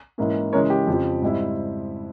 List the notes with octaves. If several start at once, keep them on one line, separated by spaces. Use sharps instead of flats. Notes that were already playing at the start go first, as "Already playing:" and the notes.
G#2 E3 A#3 C#4 E4
C#3 E3 G#3 C#4 E4 A#4 C#5
G4
F2 C#3 F3
G#2 G3 C4 E4